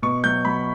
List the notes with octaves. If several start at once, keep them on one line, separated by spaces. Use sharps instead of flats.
B2 C#6
F#3 G6
F#3 B5